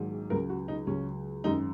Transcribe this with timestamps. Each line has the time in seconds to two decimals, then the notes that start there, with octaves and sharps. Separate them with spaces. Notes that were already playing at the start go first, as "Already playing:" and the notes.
Already playing: A#1 G#2 D#3 F#3
0.30 C#2 C#3 F#3 A#4
0.50 F#4
0.68 D#4
0.87 C#2 C#3 F#3 C#4
1.44 G#1 F#2 C#3 D#4